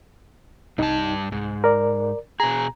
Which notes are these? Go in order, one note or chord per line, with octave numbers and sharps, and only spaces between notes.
C2 G2 D#4 A5
C2 G#2
A#4 D5
B2 G#4 A#5